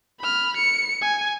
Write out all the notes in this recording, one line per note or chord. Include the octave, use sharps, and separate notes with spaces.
B5 F6
C#7
G#5